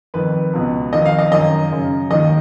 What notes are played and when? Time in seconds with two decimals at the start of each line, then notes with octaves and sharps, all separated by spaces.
0.14 F2 D#3 B4
0.53 C#2 B2
0.93 F2 D#3 D#5
1.06 F5
1.19 D#5
1.32 F#2 D#3 D#5
1.71 F#2 C#3
2.10 D#2 D#3 D#5